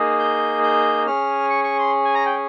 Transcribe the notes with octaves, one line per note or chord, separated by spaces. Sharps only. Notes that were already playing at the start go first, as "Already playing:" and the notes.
Already playing: A#3 D#4 G#4
G6
G6
C#4 G#4 F6
C#6
C#6
C6
G#5
A#5
G5